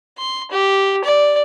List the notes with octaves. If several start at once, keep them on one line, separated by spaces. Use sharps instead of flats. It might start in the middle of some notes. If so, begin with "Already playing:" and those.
C6
G4
D5